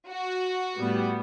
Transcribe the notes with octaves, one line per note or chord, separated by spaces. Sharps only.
F#4
A2 G3 B3